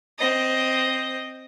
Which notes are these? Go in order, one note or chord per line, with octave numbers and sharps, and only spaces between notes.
C4 D#5